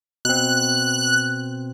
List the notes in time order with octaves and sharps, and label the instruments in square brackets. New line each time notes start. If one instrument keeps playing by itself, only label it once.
[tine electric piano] B2 C4 [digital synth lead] F#6